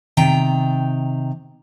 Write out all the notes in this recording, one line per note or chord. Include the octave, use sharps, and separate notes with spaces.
C3 D#3 G5 A#5